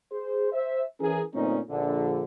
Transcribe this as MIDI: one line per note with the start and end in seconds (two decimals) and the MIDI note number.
0.11 0.50 68
0.11 0.50 72
0.52 0.83 72
0.52 0.83 76
1.00 1.21 52
1.00 1.21 61
1.00 1.21 68
1.00 1.21 70
1.33 1.59 31
1.33 1.59 46
1.33 1.59 57
1.33 1.59 60
1.33 1.59 61
1.33 1.59 63
1.70 2.23 34
1.70 2.23 50